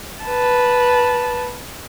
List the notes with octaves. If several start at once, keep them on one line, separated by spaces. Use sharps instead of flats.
B4 A5